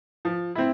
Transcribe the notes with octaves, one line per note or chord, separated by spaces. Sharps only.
F3
C4 E4